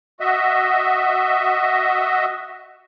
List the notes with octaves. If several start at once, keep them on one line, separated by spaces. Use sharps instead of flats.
F#4 D#5 E5